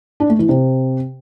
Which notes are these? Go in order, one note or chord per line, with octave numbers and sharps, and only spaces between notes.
D4
A3
E3
C3